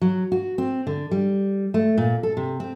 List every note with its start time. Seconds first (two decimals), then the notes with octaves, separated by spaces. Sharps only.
0.01 F#3
0.32 F#4
0.58 C4
0.87 D3
1.11 G3
1.74 A3
1.97 A#2
2.23 A4
2.37 C3
2.60 C4